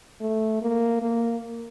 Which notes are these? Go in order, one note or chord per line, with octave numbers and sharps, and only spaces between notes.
A3
A#3
A#3